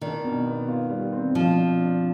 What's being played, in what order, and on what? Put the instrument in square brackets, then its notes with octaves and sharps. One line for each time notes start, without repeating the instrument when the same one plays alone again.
[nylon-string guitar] D#3 [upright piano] D4
[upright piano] B2
B3
F4
G3
C4
[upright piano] B2 [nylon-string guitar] F3
[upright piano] D4
D4